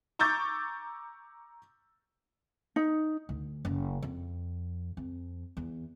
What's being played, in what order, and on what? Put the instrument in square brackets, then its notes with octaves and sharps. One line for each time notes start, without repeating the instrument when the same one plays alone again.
[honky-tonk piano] A#5 C#6 D6 E6 G6 A6
[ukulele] D#4
[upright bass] D2
F#1
F2
F2
E2